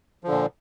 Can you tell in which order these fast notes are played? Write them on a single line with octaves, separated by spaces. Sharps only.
F3 D3 A#2